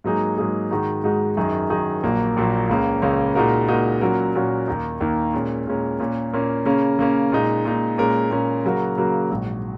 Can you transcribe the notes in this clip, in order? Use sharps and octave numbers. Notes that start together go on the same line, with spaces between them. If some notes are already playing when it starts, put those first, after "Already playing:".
G#2 F#3 A#3 D#4 G#4
G#2 F#3 A#3 D#4 G#4
G#2 D#3 G#3 D#4 F#4
G#2 D#3 G#3 D#4 F#4
F#2 D#3 F#3 D#4 G#4
F#2 D#3 F#3 D#4 G#4
A#1 A#2 F#3 A#3
A#1 A#2 F#3 A#3
C#2 C#3 A#3 C#4
C#2 C#3 A#3 C#4
A#2 G#3 D#4 F#4 A#4
A#2 G#3 D#4 F#4 A#4
A#2 F#3 C#4 F#4 A#4
A#2 F#3 C#4 F#4 A#4
D#2 D#3 A#3 D#4
D#2 D#3 A#3 D#4
A#2 G#3 C#4 A#4
A#2 G#3 C#4 A#4
A#2 A#3 C#4
A#2 A#3 C#4
C#3 A#3 C#4
C#3 A#3 C#4
A#2 G#3 D#4
A#2 G#3 D#4
A#2 G#3 C#4 A#4
A#2 G#3 C#4 A#4
C#3 F#3 A#3 F#4 A#4
C#3 F#3 A#3 F#4 A#4
A#1 G#2 F#3